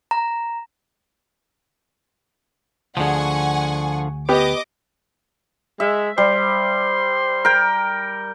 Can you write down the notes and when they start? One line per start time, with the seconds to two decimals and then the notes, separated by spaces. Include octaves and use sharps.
0.11 A#5
2.97 D2 D3 F3 G#4 F#5 G#5 C#6
4.29 B3 G4 D#5 D6
5.80 G#3 E5
6.18 G3 C5
7.45 A#4 G5